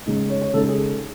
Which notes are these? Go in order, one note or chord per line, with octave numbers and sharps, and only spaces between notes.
C#3 G#3 D#4
C#5
C#5
C#3 G#3 D#4 A4
A4
G#4